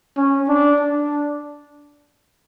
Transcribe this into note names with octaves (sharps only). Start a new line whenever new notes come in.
C#4
D4
D4